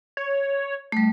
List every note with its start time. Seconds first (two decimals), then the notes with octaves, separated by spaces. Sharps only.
0.17 C#5
0.92 G3 A3